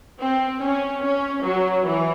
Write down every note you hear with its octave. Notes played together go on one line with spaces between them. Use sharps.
C4
C#4
C#4
F#3
E3